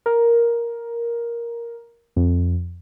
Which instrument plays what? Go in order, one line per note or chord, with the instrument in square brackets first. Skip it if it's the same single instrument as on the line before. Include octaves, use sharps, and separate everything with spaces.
[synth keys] A#4
F2